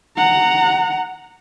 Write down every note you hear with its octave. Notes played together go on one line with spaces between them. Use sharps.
F#5 A#5